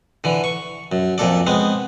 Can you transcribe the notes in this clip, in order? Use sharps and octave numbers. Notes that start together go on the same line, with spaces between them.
D3 E3
C#6
F#2
F2 A#2 A4 D5
G#3 B3 C4